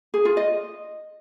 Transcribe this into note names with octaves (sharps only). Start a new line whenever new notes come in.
G#4
F4
D#5